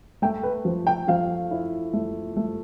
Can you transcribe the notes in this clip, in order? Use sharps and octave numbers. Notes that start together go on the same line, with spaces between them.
A3 G5
B4
F3
G5
F3 F5
E4
A3
A3